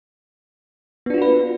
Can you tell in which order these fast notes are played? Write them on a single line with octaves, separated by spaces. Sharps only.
B3 D4 F4 F#4 B4